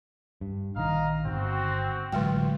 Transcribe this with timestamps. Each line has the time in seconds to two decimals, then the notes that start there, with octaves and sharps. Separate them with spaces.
0.41 G2
0.76 A#1 D#3 D#5 F5 A#5
1.25 G1 C4 F#4
2.12 A1 D3 F#3 G#3 G5